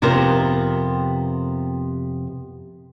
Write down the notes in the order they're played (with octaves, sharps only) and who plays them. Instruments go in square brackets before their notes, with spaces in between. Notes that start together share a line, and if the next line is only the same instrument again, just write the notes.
[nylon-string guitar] F2 C3 B3 A#4 C5